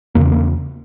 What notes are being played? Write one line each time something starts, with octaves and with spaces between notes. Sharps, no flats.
E2 C#3 A#3
A#3